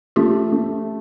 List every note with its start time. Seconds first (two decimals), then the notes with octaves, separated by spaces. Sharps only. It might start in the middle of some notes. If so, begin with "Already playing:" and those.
0.16 A3 F4 G4
0.52 A3